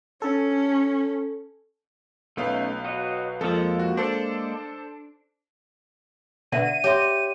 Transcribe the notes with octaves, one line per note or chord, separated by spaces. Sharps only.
C#4 A4
B1 A3 B3 C#4 D#4 F5
F#4 C#5 D#5
F2 F3 G#3 A#3 A4
F#4
D4 A4 C5
B2 D3 B3 D5 E5 F#5 D#7
G4 C#5 E5 C6